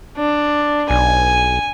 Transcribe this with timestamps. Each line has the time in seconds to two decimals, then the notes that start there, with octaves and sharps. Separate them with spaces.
0.17 D4
0.90 B1 G#5